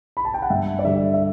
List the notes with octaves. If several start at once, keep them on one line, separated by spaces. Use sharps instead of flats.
B5
A5
G5
F#5
G2 E5
D5
D3 G3 E5
E5